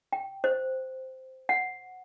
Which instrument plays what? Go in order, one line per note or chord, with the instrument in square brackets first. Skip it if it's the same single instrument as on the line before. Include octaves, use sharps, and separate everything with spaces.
[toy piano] G5
C5
F#5